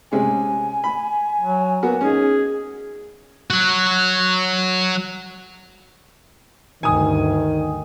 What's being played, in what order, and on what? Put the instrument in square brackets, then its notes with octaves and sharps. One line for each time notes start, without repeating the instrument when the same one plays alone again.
[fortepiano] C3 G#3 C#4 [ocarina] G#5
[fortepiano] B5
[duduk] F#3
[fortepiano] A#3 B3 F#4
[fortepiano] C#4 D#4 [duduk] G#4
[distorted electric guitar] F#3 F#4
[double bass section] D2 G2 [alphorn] D#3 [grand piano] G#5 D#6